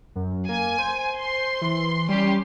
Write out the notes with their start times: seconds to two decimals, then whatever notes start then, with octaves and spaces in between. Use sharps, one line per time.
0.15 F#2
0.49 A#3 G#5
0.78 C5
1.19 C6
1.62 E3
2.09 G3 C#4 G4 C6